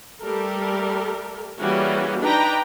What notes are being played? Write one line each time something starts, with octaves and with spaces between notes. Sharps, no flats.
G3 A3 A4 A#4
E3 G3 A#3 C#4 F#4 G#4
D4 D#4 B4 G5 A#5